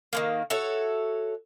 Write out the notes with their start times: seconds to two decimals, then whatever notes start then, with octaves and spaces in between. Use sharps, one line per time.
0.13 D#3 G#3 A#3
0.50 F#4 A4 C#5 E5